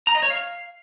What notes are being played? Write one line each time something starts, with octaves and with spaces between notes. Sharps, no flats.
A#5
D#5
C#5
F5